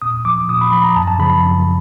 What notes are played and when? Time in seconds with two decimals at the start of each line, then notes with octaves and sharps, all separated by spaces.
0.02 A#2 D#6
0.25 F3 D6
0.49 A#2 D#6
0.61 B5
0.72 F3 B5
0.84 A#5
0.96 F#2 A5
1.08 A5
1.19 C#3 F3 B5
1.43 F#2